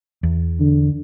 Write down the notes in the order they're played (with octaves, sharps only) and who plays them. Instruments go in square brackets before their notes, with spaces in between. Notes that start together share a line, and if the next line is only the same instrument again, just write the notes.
[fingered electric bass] E2
[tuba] D3